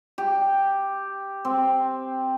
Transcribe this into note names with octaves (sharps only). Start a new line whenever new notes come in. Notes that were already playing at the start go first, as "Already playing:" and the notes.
G4
C4